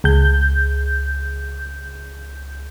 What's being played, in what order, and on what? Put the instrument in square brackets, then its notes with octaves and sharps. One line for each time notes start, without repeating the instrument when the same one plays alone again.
[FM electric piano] C#2 G6